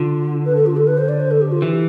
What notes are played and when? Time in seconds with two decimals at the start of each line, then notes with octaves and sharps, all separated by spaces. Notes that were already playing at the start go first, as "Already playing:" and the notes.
Already playing: D3 F4
0.45 B4
0.56 A4
0.66 F4
0.77 A4
0.87 B4
0.98 C5
1.09 D5
1.20 C5
1.31 A4
1.41 G4
1.52 F4
1.62 E3 G4